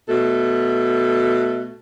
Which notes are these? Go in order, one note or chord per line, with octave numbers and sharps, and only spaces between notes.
B2 A3 A4